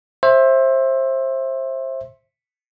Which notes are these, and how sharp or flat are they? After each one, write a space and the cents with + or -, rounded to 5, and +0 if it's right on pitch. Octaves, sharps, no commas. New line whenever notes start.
C5 +25 E5 +0